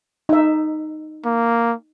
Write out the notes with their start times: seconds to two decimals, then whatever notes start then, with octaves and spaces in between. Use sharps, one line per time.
0.29 D#4 E5
1.25 A#3